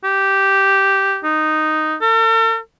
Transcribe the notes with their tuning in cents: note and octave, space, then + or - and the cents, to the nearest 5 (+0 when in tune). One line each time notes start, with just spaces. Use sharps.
G4 -5
D#4 -5
A4 +45